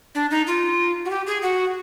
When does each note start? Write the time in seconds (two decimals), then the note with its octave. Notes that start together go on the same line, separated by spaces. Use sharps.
0.15 D4
0.31 D#4
0.47 F4
1.05 F#4
1.10 G4
1.27 G#4
1.42 F#4